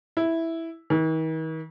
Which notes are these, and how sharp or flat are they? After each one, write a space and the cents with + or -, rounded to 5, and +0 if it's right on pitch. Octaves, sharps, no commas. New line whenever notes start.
E4 -5
D#3 +45